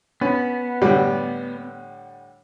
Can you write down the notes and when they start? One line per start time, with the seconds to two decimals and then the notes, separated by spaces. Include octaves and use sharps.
0.21 B3 C#4
0.82 A2 D3 G3